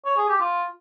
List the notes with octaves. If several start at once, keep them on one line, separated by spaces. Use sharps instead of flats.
C#5
G#4
G4
F4